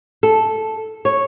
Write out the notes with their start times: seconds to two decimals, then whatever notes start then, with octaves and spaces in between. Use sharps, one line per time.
0.23 A4
1.05 C#5